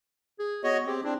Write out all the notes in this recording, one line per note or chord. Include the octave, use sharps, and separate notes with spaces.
G#4
B3 F#4 C#5 D#5
C4 G4 G#4
C4 D4 E4